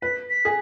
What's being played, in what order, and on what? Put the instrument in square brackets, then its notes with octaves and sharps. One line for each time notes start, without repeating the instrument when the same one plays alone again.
[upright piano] B4 [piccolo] B6
[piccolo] B6
[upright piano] G#4